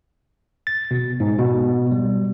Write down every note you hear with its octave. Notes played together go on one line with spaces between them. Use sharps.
A6
B2
G#2
B2
G3